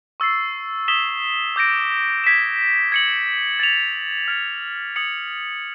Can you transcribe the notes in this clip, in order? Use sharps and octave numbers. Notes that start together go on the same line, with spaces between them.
C#6 E6 A6 C7
D#6 G#6 B6 E7 G7
D6 G6 A#6 D7
G#6 B6 E7
G#6 C#7 F#7
A6 C#7 F7
F6 G#6 C#7
D#6 G#6 C#7 F#7